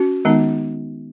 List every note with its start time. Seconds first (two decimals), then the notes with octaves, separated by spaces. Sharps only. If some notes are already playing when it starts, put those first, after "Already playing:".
Already playing: C#4 F#4
0.25 D#3 G#3 B3 D#4